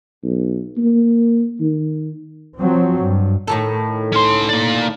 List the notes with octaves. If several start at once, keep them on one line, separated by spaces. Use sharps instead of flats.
B1
A#3
D#3
F3 F#3 C4
G2
A2 D#3 A4
C#4 C6
A#3 D5